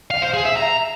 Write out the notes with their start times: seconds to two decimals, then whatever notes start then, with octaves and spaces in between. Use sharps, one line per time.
0.10 F5
0.22 C5
0.34 G#4
0.45 E5
0.57 A#5